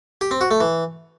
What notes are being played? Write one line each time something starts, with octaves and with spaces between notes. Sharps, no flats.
G4
C4
F#4
A3
E3